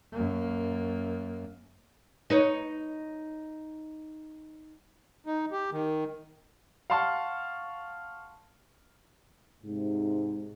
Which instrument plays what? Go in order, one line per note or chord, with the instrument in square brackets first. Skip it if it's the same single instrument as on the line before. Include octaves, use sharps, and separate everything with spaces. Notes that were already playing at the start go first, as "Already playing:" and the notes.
[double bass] F#2 A#3
[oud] D#4 B4 C#5
[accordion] D#4
G4
D#3
[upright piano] F5 F#5 A5 C6 C#6 F6
[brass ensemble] G#2 C3